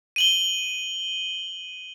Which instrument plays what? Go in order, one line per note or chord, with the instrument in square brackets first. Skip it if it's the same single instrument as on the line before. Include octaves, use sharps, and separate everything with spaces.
[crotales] D#7 F#7 G7